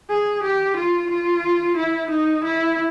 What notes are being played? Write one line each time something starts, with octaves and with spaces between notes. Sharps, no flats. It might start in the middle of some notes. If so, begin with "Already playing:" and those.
G#4
G4
F4
F4
E4
D#4
E4